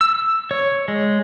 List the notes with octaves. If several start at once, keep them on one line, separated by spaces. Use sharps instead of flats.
E6
C#5
G#3